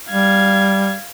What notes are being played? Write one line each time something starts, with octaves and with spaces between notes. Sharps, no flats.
G3 F5 G#6